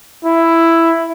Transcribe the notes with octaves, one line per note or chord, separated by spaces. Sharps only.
E4